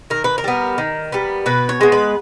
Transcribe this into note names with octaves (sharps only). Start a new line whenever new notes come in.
D#3 A#4
B4
A#4
G3 B3
D#3
G3 B3
B2 B4
C#5
G#3 B3
B4